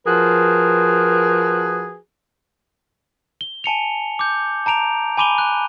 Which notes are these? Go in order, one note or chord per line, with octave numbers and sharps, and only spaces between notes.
F3 F#4 G#4 A#4 B4
G7
G#5 A5 C#7 F7
D6 G6
A5 A#5 D7 F7
G#5 B5 D6 D#7 F7 G7
F#6